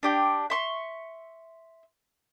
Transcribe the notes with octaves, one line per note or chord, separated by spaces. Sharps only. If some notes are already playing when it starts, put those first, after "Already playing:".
D4 G4 G5
E5 C6 C#6